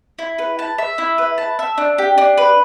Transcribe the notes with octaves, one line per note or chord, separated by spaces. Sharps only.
E4
B4
A5
E5
E4
B4
A5
E5
D4
G4
D4
B4